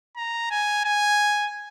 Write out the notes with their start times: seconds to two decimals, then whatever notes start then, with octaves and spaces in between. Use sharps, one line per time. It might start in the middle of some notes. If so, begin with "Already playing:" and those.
0.17 A#5
0.51 G#5
0.85 G#5